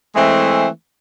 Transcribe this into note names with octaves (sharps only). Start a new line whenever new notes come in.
E3 G#3 A3 C4